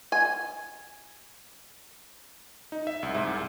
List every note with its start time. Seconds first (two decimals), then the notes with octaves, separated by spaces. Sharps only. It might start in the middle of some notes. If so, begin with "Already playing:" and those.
0.12 G#5
2.72 D#4
2.87 E5
3.03 C2
3.15 G#2
3.27 C2